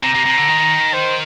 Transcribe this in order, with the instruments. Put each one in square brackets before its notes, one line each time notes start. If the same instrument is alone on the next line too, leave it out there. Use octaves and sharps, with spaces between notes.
[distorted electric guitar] C3 [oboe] A#5
[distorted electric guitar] C3
C3
D3
D#3
[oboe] C5